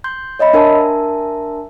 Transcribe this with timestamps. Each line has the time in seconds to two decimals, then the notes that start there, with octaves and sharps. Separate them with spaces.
0.04 C6 G6
0.39 C#5 D#5 E5 B5
0.53 D4 A#4 E5 A5 C6